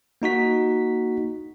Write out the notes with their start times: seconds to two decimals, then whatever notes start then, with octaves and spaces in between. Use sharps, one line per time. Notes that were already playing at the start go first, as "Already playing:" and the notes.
0.22 A#3 D#4 F#4 B6